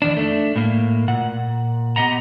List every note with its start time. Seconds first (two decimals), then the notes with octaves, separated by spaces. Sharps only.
0.02 E2 D#3 D4
0.17 A3 D4
0.56 A2 A#3
1.08 A#2 F#5
1.96 B3 G4 D#5 F#5 A#5